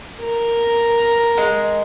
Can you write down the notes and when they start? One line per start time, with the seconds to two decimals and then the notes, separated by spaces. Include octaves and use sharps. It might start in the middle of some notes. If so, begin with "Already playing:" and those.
0.21 A#4
1.37 G#3